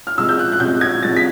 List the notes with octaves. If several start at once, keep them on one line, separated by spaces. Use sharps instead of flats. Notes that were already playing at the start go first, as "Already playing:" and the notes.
F6
C3 F3 G#3 E6
G6
F#6
F#6
C3 F3 G#3 G6
G#6
C3 F3 G#3 A6
B6